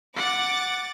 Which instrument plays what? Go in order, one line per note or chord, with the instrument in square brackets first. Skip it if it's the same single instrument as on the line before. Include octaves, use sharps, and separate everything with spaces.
[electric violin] F#5 [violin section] D6 A6